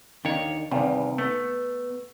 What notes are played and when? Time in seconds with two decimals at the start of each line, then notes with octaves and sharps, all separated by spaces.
0.25 D#2 D#3 D4 C#5
0.71 E2 G2 C3 D#3
1.18 A3 B3